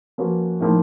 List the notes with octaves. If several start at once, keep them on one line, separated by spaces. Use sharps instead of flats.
F3 A#3 C#4 F#4 B4
A2 F3 A#3 D#4